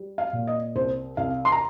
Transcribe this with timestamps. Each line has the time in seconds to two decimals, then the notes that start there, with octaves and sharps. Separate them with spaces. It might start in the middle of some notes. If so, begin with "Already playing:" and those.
Already playing: G3
0.18 F5
0.33 A#2
0.47 D#5
0.76 C2 C5
1.17 C2 F5
1.45 C6
1.52 A#5